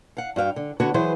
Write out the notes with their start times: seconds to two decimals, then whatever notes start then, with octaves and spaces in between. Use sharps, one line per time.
0.17 F5 F#5
0.36 G2 F#4 F5 G5
0.56 D3
0.80 D3 B3 F#4 C#5
0.94 E3 F#3 G#4 B4 C5